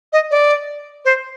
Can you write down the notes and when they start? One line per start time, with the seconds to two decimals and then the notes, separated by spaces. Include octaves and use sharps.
0.13 D#5
0.31 D5
1.05 C5